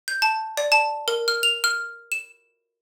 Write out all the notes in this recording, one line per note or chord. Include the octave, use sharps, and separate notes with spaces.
G6
A5
D5
A5
A#4
F6
F7
F6
E7